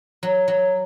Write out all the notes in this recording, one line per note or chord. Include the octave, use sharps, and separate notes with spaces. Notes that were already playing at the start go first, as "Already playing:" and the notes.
F#3
F#3